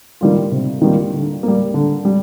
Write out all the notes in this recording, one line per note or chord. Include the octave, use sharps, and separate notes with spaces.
D#3 G3 A#3 F4
C3
D#3 G3 A#3 F4
D3
G3 A#3
D3
G3